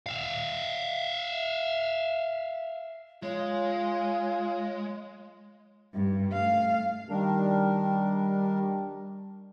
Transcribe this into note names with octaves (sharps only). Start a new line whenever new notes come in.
E5 F5
G#3 F4 C#5
G2
A3 F5
D#3 G3 D4 A#4